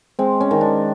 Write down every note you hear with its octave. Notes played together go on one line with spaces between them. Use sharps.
G#3 C4
C#4
D#3
D4